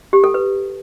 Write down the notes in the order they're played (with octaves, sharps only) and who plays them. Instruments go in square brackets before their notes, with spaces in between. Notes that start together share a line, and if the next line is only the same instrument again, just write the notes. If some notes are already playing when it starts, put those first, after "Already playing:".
[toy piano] G4
A4
B4